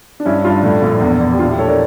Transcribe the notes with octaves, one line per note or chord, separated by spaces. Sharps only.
D4
G2 C#4 E4
G2 D4 F4
A2
A#1
E2
E2
G4
A#1 D4 F4
E4 G4
A3 A4 C#5
A#4 D5